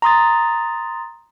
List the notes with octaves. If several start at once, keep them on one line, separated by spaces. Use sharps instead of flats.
A#5 C6 D#6 A6